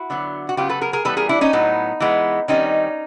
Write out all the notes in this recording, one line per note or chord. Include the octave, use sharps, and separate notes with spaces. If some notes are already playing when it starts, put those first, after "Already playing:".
Already playing: E4 F#4
D3 F#3 B3
F#4
C#3 F#3 B3 F4 G4
A4 B4
G#4 A#4
G#4 A#4
E3 G3 B3 A4 B4
G#4 A#4
D4 E4
C#4 D#4
A2 F#3 B3
E3 G#3 B3
D#3 G3 C4 C#4 D#4